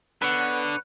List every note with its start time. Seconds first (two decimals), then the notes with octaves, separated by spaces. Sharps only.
0.22 D3 B3 B4 C#5 F#5 F#6